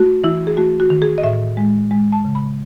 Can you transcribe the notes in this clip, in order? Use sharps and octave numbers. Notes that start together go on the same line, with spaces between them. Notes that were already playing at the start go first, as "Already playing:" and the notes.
Already playing: A3 F#4
E3 E4
G#4
A3 F#4
F#4
D#3
G#4
D#5
A2 E5
G#3
G#3
A5
C#3
B5